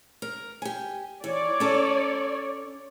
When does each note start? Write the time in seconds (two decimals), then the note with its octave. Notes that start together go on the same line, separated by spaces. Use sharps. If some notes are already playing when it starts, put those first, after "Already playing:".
0.22 A#4
0.62 G4 G#5
1.24 E3 C#5 D5
1.60 C#4 A4 A#5